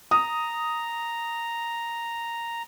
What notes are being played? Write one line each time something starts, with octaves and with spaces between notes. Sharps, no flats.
A#5 D#6